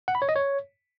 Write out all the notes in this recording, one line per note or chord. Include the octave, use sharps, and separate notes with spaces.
F#5
B5
C#5
D#5
C#5